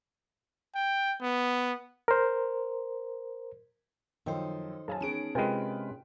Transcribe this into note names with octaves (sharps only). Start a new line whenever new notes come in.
G5
B3
A#4 C5
F#2 D#3 F3 D#4 A4 C5 G5
F#2 G#4 F5 G#5 A5
D#3 B3 C#4 D#4 G#4 C#5 D7
C3 G#3 F4 A#4 B4 G5